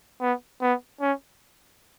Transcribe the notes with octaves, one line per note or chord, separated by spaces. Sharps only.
B3
B3
C#4